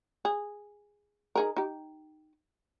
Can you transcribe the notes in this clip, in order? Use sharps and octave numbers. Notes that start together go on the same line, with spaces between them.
G#4
D#4 G#4 A#4
D#4 G4